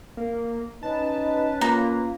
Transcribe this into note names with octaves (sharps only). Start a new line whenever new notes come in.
A#3
C#4 D#4 B4 A5
A#3 F4 A#5